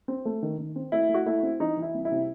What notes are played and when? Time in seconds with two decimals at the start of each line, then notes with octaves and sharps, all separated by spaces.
0.08 C4
0.25 A3
0.43 D#3
0.58 D#3
0.76 C4
0.92 A3 E4
1.09 A3
1.14 F#4
1.26 A3 E4
1.43 C4
1.60 E3 D#4
1.77 E3
1.82 E4
1.94 C2
2.05 E4
2.12 C3